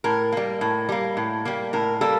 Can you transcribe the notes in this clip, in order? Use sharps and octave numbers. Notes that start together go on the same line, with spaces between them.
A2 A#4
G3 A#3
A2
G3 A#3
A2
G3 A#3
A2 A#4
G3 A#3 A4